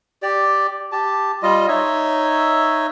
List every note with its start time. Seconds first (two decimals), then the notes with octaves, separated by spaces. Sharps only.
0.22 G4 D5
0.92 G4 A5
1.42 G3 F4 D#5
1.68 D#4 C#5 E5